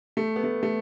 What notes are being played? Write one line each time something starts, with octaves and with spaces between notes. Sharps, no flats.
A3
B3
A3
A3